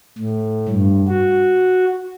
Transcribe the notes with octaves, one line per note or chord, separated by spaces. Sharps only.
A2
G2
F#4